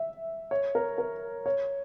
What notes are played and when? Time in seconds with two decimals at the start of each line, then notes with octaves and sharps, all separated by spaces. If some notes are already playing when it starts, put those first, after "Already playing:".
Already playing: E5
0.51 C#5
0.75 A#4
0.98 A#4
1.46 C#5